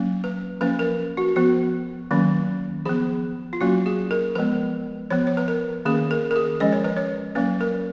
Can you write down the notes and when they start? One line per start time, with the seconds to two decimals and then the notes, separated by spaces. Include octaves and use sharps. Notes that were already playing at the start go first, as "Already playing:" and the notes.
Already playing: F#3 A#3 C#4
0.24 B4
0.61 F3 A#3 C#4 B4
0.79 A#4
1.17 F#4
1.36 F3 B3 F#4
2.11 D#3 F#3 A#3 C#4
2.85 F3 B3 G#4
3.53 F4
3.61 F#3 A#3 C#4 F#4
3.86 G#4
4.11 A#4
4.35 F3 G#3 B3 B4
5.10 F3 B3 C#5
5.27 C#5
5.37 B4
5.48 A#4
5.85 D#3 A#3 C#4 G#4
6.11 A#4
6.31 A#4
6.36 G#4
6.60 F3 G#3 C#4 D#5
6.73 C#5
6.84 B4
6.96 C#5
7.35 F#3 A#3 C#4 B4
7.61 A#4